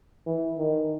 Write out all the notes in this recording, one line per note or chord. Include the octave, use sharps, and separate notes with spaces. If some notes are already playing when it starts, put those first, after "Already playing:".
E3
D#3